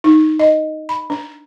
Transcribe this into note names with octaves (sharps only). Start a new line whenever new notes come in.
D#4
D#5
B5
D4